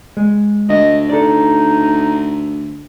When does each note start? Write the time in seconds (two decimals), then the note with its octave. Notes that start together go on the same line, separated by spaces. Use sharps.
0.17 G#3
0.69 D2 D#5
1.10 D#4 A4 D5